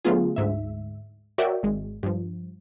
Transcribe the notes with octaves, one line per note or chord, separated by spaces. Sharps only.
D3 F#3 A3 B3 F4 G#4
D2 G#2 E5
F#4 A#4 C#5 D5 E5 G5
G#1 G#3
G2 F3